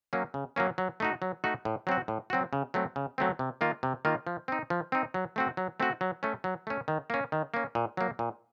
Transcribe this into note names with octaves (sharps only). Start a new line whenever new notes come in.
F#3 A#3 C#4
C#3
F#3 A#3 C#4
F#3
A3 D#4 F#4
F#3
A3 D#4 F#4
A2
F#3 C4 F#4
A2
F#3 C4 F#4
C#3
F#3 A3 C4
C#3
F#3 A3 C4
C3
D#3 A#3 F4
C3
D#3 A#3 F4
F3
C4 D#4
F3
C4 D#4
F#3
A3 C4 F#4
F#3
A3 C4 F#4
F#3
A3 C#4
F#3
A3 C#4
D#3
A#3 C#4
D#3
A#3 C#4
A#2
F#3 A#3
A#2